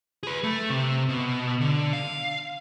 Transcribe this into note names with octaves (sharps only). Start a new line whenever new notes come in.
G#4 B4
A3
C3
B2
D3
F5